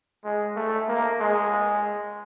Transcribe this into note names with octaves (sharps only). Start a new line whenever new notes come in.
G#3
A3
A#3
G#3